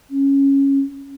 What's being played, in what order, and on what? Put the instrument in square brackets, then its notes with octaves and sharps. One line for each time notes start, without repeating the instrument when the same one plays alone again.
[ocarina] C#4